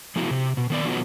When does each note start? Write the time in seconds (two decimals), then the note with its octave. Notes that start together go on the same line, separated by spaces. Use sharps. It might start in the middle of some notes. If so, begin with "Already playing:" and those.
0.16 F3 A3 B3 E4 F#4
0.31 C3
0.57 B2
0.70 D#3 B3 D5
0.85 B2 D#3 F3 F#3 A3 B3